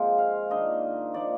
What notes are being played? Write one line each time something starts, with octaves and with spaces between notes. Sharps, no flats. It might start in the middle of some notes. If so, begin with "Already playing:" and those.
Already playing: F3 G#3 A#3 C4 F4 C5
F5
D#3 A#3 D4 F4 D#5
F3 A#3 D#4 D5